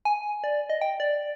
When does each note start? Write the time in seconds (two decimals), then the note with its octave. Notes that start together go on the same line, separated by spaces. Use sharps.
0.05 G#5
0.44 D5
0.70 D#5
0.81 G5
1.00 D5